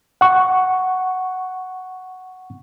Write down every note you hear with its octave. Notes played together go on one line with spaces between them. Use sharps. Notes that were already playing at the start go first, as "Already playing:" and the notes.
F#5 C#6